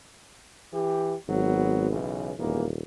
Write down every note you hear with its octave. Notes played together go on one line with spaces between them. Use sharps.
E3 G4
G#1 F#3 B3
B1 C#3 E3
D#1 E2 G#2 A#3